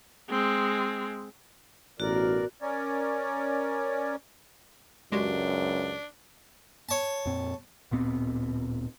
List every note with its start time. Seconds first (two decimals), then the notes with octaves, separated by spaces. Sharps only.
0.30 G#3 C4
2.00 A1 B2 F#4 A#4 D5
2.61 C#4 A#4 C#5 D5
5.12 C#2 F#2 G#3 D4 F#4 G4
6.89 C#5 A5
7.25 F2 A#2 C4
7.91 D1 A#2 B3 C4